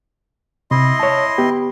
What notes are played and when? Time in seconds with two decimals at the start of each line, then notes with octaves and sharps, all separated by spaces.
0.71 C3 E4 D#5 C6
1.00 C#5 A5
1.38 B3 G4